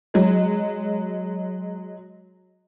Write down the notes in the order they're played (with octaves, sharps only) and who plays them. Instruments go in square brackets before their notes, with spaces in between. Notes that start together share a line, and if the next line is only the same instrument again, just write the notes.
[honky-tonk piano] F#3 G#3